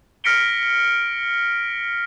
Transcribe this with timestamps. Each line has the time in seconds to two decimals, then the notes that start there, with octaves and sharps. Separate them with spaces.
0.24 F6 A#6 B6 C#7 D7 G7